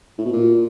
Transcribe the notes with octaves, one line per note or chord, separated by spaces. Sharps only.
A2
B2
A#2